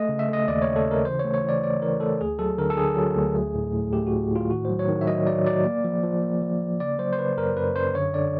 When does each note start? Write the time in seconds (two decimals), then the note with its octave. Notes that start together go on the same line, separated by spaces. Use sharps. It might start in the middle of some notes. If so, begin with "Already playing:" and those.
Already playing: A3 D#5
0.09 C#3
0.19 E5
0.28 A3
0.33 D#5
0.48 D#2 D5
0.62 C#3 C#5
0.76 A4
0.86 C#3
0.91 A#4
1.05 E3 C5
1.19 A3 C#5
1.34 C#5
1.43 E3
1.49 D5
1.62 A3 D5
1.82 E3 A#4
2.00 A3 A4
2.21 D2 G#4
2.39 F#3 A4
2.58 D3 A#4
2.70 A4
2.77 D3 G#4
2.96 F#3
3.16 D2
3.35 A3
3.55 A2
3.73 A2
3.93 A3 G4
4.07 F#4
4.12 A2
4.31 A2 F4
4.50 D#3 F#4
4.65 F#3 C5
4.79 C#5
4.88 D#3
5.01 E5
5.07 F#3 D#5
5.26 F#3 D5
5.46 F#3 D5
5.64 A#3
5.84 F3
6.03 F3
6.22 A#3
6.42 F3
6.61 A#3
6.80 C#3 D5
6.99 F#3 C5
7.13 C5
7.18 C#3 B4
7.37 F#2 A#4
7.56 F#2 B4
7.76 F#2 C5
7.95 D3 C#5
8.14 D3 D5